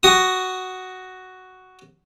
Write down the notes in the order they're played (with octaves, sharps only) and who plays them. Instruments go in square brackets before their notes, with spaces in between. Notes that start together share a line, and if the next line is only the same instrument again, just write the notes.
[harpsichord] F#4 D#6